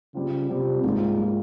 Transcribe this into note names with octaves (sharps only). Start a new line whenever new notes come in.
C#3 G3 C4 F4
C3 G3 C4 F4
G#2 G3 A#3 F4
G3 A#3 F4